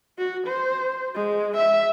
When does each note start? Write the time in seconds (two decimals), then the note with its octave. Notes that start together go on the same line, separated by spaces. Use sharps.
0.18 F#4
0.47 C5
1.15 G#3
1.57 E5